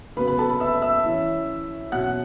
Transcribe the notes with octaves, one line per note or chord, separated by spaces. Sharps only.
C#3 F#3 B3 B4 B5
B4 B5
A4 A5
B4 B5
E5 E6
E5 E6
E3 C#4
B2 F#3 C#4 F#5 F#6